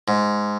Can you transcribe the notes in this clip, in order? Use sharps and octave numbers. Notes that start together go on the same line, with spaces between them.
G#2